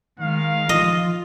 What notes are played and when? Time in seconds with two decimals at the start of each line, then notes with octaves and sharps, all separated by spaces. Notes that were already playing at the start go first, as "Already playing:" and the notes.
0.20 D#3 G#3 F5
0.69 F3 F4 D#5